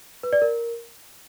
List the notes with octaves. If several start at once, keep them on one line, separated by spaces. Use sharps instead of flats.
B4
D5
A#4